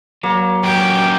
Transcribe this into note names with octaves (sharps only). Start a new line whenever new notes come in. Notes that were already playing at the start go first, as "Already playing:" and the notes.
F#3 A#3
F#2 G4 G5